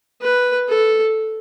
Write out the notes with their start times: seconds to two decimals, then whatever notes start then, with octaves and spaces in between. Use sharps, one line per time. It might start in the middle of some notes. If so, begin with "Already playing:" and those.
0.21 B4
0.69 A4